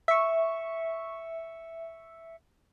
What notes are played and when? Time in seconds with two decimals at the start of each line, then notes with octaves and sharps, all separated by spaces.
0.08 E5 C#6